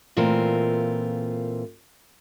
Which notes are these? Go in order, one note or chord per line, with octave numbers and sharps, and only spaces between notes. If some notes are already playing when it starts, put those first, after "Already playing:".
A#2 E3 A3 C4 F4 A#4